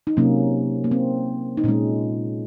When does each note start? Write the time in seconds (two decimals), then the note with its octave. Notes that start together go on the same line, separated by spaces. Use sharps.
0.07 D#4
0.17 C3 F#3 A#3 C#4
0.84 A#3
0.91 C4
1.57 D#4
1.64 A#2 G#3 C#4